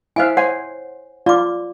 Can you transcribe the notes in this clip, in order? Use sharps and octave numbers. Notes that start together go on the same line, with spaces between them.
E4 C5 E5 F5 G#5
C5 C#5 F#5 G#5
F4 D5 D6